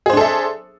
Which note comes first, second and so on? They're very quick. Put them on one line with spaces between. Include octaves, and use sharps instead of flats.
G#4 C5 D4 A4 E5